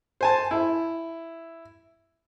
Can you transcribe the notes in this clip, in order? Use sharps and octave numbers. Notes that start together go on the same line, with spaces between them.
C5 G#5 A5
E4